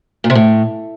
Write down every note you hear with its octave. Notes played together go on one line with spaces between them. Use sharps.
A#2
C3
A2